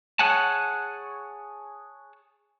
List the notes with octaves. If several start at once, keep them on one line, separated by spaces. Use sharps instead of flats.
G#4 C#5 F#5 G#5 A5